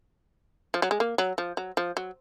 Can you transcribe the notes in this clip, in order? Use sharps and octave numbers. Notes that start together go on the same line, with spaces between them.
F3
F#3
G#3
A#3
F#3
F3
F#3
F3
F#3